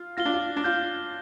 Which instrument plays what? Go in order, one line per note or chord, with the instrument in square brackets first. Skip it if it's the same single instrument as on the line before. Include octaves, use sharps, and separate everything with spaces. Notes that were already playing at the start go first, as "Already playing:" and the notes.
Already playing: [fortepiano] F4
[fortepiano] F4 [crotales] A#6 G7
[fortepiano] D4
F4
D4
[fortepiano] F4 [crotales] G6